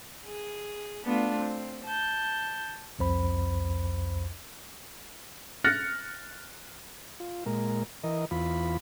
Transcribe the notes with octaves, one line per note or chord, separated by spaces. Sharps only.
G#4
A3 B3 D4 F4
C4
A5 G6
C2 F2 C5 B5
F6 F#6 A6 A#6 C#7
F4
A#2 G#3 A#4
E3 A#4 D#5
E2 F4 B5